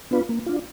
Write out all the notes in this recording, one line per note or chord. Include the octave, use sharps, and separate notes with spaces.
B3 D4 F4 B4
A#3
D4 F4